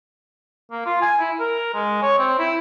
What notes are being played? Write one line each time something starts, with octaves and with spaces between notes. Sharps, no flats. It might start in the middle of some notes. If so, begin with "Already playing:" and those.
A#3
F4
G#5
E4
A#4
G#3
C#5
C4
E4